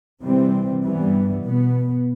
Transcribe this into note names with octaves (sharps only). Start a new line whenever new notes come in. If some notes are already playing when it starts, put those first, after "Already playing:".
C3 E3 G3 C4
G2 E3 G3 B3
B2 B3